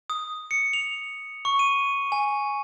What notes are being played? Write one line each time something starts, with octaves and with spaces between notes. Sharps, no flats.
D#6
C#7
F7
C#6
D#7
G#5